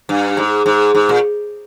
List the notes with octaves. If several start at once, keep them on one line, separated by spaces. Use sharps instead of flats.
G2
G#2
G#2
G#2
A#2